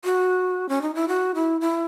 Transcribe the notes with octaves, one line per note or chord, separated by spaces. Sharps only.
F#4
C#4
D#4
E4
F#4
E4
E4